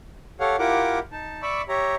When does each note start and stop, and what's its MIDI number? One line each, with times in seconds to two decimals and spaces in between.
0.40 0.56 67
0.40 0.56 69
0.40 0.56 73
0.40 0.56 77
0.40 0.56 78
0.59 0.99 64
0.59 0.99 65
0.59 0.99 67
0.59 0.99 70
0.59 0.99 78
0.59 0.99 86
1.12 1.42 63
1.12 1.42 81
1.42 1.62 74
1.42 1.62 76
1.42 1.62 83
1.42 1.62 85
1.42 1.62 86
1.42 1.62 88
1.69 1.96 67
1.69 1.96 73
1.69 1.96 76
1.69 1.96 82